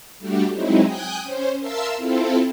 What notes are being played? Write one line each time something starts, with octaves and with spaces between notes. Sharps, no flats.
G3 A3 D4 F#4 G4
F#3 G#3 C4 D#4 E4
G5 G#5 D#6 F#6 G6
C#4 C5
A#4 E5 F5 A5 C6 E6
C4 E4 F4 A4